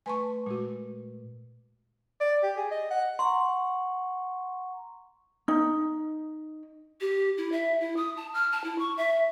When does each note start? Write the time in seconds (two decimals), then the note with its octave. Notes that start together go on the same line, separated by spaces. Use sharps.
0.06 A3 B4 G#5 A5 C6 C#6
0.46 A#2 G#3 F#4
2.21 D5
2.43 G4
2.57 G#4
2.71 D#5
2.91 F#5
3.19 F#5 A#5 C6 C#6
5.48 D#4
7.01 G4
7.38 E4
7.52 E5
7.80 E4
7.97 D#6
8.17 A5
8.34 F6
8.52 A5
8.64 E4
8.79 C#6
8.97 E5